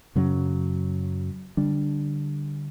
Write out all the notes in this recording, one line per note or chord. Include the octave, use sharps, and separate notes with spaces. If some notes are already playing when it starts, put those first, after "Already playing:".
F#2 C#3 F#3 C#4
D3 G3 D4